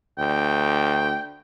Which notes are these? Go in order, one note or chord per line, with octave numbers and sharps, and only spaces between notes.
D2 G5